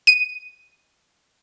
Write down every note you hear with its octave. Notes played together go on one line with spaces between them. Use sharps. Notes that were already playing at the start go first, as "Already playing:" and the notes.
D#7